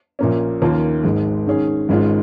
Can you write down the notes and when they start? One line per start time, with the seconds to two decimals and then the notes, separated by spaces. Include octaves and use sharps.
0.19 A#1 A#2 A#3 C#4
0.61 D#2 D#3 A#3 C#4 F4
1.03 G#1 G#2 G#3
1.47 G#2 D#3 C#4 G#4
1.89 G#1 G#2 G#3 C#4 F4